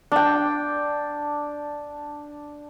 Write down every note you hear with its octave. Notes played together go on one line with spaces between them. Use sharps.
D4 G5